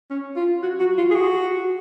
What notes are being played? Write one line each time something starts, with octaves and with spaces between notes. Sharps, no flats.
C#4
F4
F#4
F#4
F4
G#4
F#4